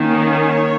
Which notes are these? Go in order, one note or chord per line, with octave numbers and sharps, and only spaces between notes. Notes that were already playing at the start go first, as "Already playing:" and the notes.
Already playing: D#3 A#3 C#4
C#5